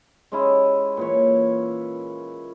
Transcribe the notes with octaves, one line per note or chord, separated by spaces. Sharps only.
G#3 C#4 E4
A#2 E3 C#5